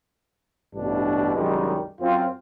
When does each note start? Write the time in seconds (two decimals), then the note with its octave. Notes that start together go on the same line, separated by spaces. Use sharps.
0.75 A1 G2 B2 E3 D4
1.35 C2 F#2 D#3 G3 G#3
2.00 F#2 C4 F4